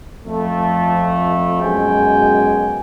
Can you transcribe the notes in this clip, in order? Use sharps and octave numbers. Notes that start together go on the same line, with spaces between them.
F2 A3
F#2 B2 G#3 G5 G#5